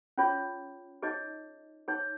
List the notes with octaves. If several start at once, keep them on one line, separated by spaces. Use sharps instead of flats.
C#4 F4 G#4 C#5
D#4 G#4 C#5 D#5
D#4 G#4 C#5